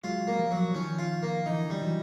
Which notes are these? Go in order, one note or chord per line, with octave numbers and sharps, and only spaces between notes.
F#3 G#3 F4
A#3
F3 G3
F#3
D#3 F3 C#4
F4
A#3
D3 E3 D#4
G3
E3 F#3